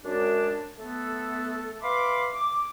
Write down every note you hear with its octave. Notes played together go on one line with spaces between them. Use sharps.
F#2 G#3 D4
A3 B3 A4
B4 E5 F5 B5 C6 D6
D6